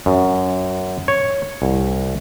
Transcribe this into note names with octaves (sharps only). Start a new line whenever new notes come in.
F#2
C#5
C2